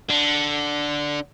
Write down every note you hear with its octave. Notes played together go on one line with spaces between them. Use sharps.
D3